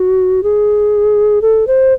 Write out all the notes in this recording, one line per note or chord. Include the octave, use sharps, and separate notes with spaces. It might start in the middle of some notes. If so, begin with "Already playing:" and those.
Already playing: F#4
G#4
A4
C5